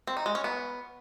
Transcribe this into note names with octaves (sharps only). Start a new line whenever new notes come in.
C4
D#4
G#3
C#4
B3